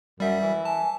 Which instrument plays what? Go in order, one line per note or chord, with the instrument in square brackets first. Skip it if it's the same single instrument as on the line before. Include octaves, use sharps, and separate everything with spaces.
[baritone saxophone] F#2 [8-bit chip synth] G3 E5
[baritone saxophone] E3
[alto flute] G#5 [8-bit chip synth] A5